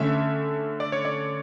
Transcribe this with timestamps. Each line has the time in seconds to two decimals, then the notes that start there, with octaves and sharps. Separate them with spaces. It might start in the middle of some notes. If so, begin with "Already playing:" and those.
Already playing: D3 A3 C#4 E5
0.80 D5
0.92 C#5
1.05 D5